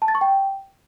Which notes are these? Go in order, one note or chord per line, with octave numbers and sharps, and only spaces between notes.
A5
A6
C#6
G5